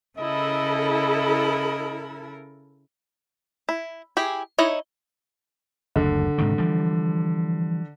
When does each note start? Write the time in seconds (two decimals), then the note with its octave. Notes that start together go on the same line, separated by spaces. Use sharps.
0.19 C#3 E4 A4 A#4 D#5
3.69 E4
4.17 E4 G4 G#4
4.58 D#4 E4 C#5 D#5
5.96 F#1 D2 D3
6.38 G#2 C3 D#3
6.58 E3 F3 G3